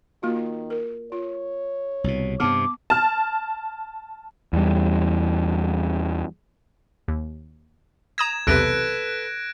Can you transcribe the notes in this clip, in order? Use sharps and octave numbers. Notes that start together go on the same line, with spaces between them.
D#3 A#3 F4 F#4
A#4
F4 C#5
C2 B2
G2 C3 B3 A5 D6
A5 F6
E2 G3
D#2
A#5 D#6 G#6 A#6 E7
B1 E2 C3 A4 B4 F#6 A#6 D7